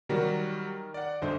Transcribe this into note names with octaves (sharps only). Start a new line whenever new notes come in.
D#3 F#3 G3 F#4 A#4
D5 F#5
G1 D#4 C5